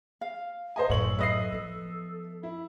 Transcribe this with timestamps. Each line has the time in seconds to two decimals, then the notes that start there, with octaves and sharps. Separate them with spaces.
0.21 F5
0.76 C5 D#5 G#5
0.90 F#2 A2 A4 C#5 F#7
1.19 B4 D#5 E5 D#6 C7
1.52 F3 B3
2.43 E4 B5